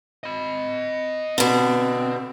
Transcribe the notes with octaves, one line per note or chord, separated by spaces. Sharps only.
D#5 B5
B2 D3 C4